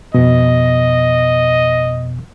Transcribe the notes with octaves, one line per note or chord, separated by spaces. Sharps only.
F2 B2 D#5